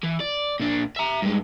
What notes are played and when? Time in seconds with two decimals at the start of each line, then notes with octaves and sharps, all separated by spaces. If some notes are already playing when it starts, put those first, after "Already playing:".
0.03 E3
0.20 D5
0.60 A#2 D4
0.96 E5 A#5
1.22 G2 G#3